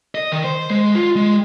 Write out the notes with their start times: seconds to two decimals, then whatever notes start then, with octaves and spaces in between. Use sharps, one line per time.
0.15 D#5
0.32 D#3
0.44 C5
0.70 G#3
0.95 F4
1.16 G#3